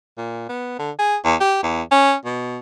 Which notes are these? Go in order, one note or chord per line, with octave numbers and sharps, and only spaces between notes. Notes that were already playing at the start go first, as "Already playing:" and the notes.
A#2
B3
D3
G#4
E2
G4
E2
C#4
B2